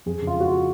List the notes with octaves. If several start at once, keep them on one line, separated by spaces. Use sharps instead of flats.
F2 G#4
C#3
F4
G#3 F#4
F4